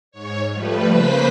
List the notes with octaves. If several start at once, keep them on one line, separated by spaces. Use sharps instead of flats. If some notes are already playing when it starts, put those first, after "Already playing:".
G#2 C#5
F3 G3 A3 B4
C#3 A#3 B4 C5 B6